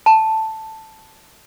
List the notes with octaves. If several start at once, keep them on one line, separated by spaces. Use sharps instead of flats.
A5